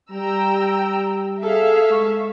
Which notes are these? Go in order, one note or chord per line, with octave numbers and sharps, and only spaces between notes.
G3 G5 A#5 E6
G#4 A4 E5 F5
G#3 C#6